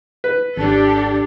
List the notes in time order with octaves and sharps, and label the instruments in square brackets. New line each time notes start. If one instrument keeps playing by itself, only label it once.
[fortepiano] B4
[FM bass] G#1 [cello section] D4 G4 A4